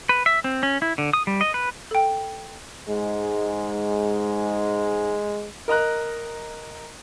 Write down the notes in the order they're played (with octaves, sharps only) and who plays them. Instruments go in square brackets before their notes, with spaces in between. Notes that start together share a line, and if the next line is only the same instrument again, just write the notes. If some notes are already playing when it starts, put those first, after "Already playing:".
[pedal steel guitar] B4
E5
C4
C#4
E4
D3
D#6
G3
D#5
B4
[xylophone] A4 G5
[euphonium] G#2 [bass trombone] G#3
[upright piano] A#4 D#5 A#5 F#6